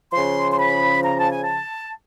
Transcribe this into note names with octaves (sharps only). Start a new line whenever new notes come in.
C#3 F3 C6
C6
B5
A#5
A5
G#5
A5